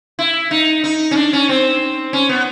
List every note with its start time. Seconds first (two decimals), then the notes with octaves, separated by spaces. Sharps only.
0.19 E4
0.51 D#4
0.84 D#4
1.11 C#4
1.16 D4
1.33 C#4
1.49 C4
2.13 C#4
2.29 B3